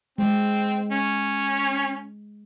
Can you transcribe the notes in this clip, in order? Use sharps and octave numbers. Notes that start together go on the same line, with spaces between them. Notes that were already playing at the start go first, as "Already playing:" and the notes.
G#3 C4
C#4